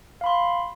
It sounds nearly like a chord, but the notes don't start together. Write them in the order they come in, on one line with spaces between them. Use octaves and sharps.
F5 B5 C6